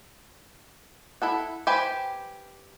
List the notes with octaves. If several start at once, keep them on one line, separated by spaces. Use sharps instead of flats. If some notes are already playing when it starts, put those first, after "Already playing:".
E4 A4 F#5
G4 B4 C5 G5 G#5